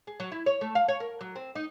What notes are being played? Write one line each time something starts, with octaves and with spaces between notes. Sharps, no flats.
G#4
F#3
E4
C#5
A3
F5
C#5
A#4
F#3
C4
D#4